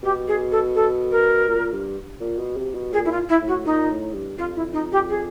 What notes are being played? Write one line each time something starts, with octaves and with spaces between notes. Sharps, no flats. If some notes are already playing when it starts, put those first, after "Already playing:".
B2 G4
G#4
A4
A4
A#4
A#2
G2
A#2
B2
C3
B2
A#2 G#4
E4
F4
E4
A2
F#4
A#2 D#4
A2
G2
F2 F4
E4
D#4
G4
G#4